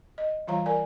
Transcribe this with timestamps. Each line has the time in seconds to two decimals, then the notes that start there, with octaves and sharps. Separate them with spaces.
0.18 D#5
0.47 E3 G3 F4 C#5 F5 A#5
0.66 A#4 D5 G#5